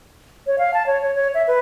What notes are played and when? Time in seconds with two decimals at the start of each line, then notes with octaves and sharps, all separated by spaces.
0.47 C#5
0.58 F5
0.74 A5
0.86 C#5
1.02 C#5
1.15 C#5
1.34 E5
1.47 B4